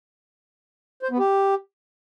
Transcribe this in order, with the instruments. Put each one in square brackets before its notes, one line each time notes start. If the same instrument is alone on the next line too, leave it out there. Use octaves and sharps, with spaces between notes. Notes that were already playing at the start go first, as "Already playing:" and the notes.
[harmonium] C5
B3
G4